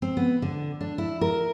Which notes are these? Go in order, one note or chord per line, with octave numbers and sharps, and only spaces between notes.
C4
B3
D3
D4
E4
A#4